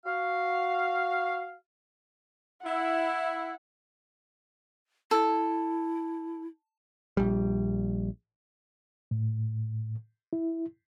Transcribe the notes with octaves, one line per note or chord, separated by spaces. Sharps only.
F#4 F5
E4 F#5
E4 A4
A#1 G3
A2
E4